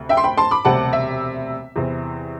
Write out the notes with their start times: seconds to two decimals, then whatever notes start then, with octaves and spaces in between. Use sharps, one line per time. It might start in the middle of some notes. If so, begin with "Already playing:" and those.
Already playing: D2 C3
0.09 E5 G5
0.17 C6
0.24 G5 B5
0.37 A5 C6
0.51 B5 D6
0.65 E1 D2 C3 G3 F#5 A5
0.93 E5
1.76 E2 C3 E3